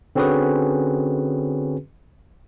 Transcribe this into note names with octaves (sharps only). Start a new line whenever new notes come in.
D3 C4 C#4 F#4 G#4 B4